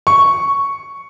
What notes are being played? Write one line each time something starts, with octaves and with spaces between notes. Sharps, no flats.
C#6